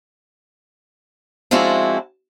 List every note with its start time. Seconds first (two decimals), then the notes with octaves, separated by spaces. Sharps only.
1.51 F3 G#3 C4 D4 E4 F#4